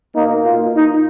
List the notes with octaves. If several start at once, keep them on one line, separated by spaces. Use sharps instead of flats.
B2 A#3 D#4
F4
D#4